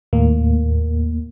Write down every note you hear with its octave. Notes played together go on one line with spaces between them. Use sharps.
D#2 A2 A#3